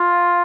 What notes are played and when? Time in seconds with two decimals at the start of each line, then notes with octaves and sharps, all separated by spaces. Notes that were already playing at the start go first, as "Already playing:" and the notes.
Already playing: F4